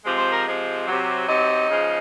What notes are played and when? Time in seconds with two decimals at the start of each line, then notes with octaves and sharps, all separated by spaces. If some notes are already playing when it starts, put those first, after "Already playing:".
0.05 C3 F3 G#3
0.18 C5
0.32 A#4
0.45 C3 F3 G#3
0.87 C3 F#3
1.27 C3 F#3 D#4
1.69 C#3 F3 G#3